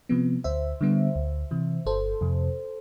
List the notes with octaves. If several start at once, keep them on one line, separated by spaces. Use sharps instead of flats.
C3 F3 B3
D2 C5 E5
D3 G3 B3
D2
C3 E3
G1 A4 C5
F2 C3